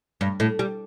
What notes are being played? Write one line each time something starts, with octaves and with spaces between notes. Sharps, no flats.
G2
A2
G3